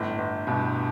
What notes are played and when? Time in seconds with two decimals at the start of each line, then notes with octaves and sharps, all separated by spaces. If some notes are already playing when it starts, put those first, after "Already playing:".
Already playing: G1 A2
0.18 G1
0.47 G2 B2